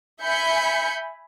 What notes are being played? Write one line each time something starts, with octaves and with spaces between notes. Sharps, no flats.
E5 G#5 B5 G6 C#7